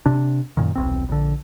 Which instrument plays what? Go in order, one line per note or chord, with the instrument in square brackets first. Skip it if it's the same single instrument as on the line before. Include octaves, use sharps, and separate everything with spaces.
[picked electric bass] C3 D4
F#2 A#2 D#3
D#1 B1 C4
A#1 D3